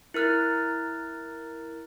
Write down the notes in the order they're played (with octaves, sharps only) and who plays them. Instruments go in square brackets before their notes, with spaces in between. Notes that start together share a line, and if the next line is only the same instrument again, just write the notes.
[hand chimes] E4 A#4 F6 F#6 A6